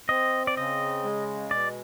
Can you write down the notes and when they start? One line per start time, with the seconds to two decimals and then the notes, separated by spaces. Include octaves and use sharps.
0.09 C4 D#5
0.47 D5
0.57 C#3 D#5
1.04 G#3
1.51 B2 D5